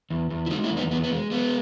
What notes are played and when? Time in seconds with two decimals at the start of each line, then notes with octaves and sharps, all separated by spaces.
0.10 E2
0.30 E2
0.46 E4
0.50 G#3 D#4 F#4
0.64 C#4 E4
0.70 E2
0.77 B3 D#4
0.91 E2 B3
1.04 B3
1.10 G#3
1.31 G#3 B3